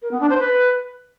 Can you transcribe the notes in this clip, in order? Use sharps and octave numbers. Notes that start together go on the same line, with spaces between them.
A#4
B3
D4
C5
B4